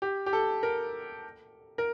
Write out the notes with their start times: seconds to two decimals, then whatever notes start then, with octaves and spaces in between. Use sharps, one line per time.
0.02 G4
0.26 G4
0.33 A4
0.63 A#4
1.78 A#4